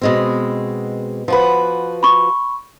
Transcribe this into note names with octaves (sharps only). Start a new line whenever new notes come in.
B2 G#3 C4
F3 F#4 B4
B5 C#6